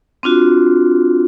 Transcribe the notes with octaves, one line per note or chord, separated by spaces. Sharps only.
C4 D4 F4 F#4